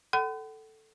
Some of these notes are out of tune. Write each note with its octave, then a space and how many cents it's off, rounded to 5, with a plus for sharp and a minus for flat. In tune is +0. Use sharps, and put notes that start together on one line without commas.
A4 +0 F#5 +40 B5 +45